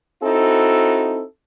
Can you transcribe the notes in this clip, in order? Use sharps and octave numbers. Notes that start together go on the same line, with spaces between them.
C4 D#4 E4 F#4 A4